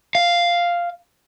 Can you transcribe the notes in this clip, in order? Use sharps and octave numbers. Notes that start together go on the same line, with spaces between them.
F5